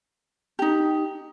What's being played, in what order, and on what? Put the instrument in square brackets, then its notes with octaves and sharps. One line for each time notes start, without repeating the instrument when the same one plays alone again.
[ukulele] D#4 G4